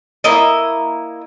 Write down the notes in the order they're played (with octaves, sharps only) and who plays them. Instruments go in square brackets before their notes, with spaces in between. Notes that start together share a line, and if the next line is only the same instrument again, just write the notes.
[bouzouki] A#3 E4 D#5